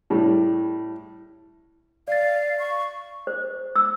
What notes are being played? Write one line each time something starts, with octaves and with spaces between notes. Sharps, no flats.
A2 G3
D5 F5 A6
C#6
C5
E6